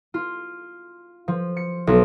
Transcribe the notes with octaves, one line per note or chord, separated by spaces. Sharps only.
F4
F3
C#7
B1